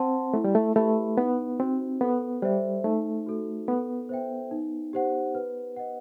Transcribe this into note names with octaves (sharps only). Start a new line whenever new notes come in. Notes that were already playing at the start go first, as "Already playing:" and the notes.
Already playing: C4 C5 F#5 A5 C6
A3 E4
G3
A3
A3 G4 B4 E5 B5
B3 D#4
C4 F#4 C5
B3 A4
G3 C5 E5
A3 D#4
F#4 A4
B3 A4
C5 E5 G5
D#4
G4 C5 F#5
B4
D#5 F#5